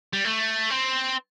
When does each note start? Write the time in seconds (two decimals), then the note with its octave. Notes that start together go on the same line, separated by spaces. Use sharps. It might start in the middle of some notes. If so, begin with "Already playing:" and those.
0.13 G3
0.25 A3
0.70 C4